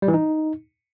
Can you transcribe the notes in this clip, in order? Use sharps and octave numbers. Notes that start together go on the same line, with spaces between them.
G3
E3
D#4